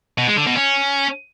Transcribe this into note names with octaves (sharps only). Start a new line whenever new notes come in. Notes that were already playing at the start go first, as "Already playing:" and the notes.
B2
G#3
D3
B2
C#4